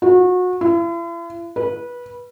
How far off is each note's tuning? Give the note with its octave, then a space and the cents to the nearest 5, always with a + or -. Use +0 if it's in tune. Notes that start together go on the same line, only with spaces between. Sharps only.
F#4 -30
E4 +45
B4 -20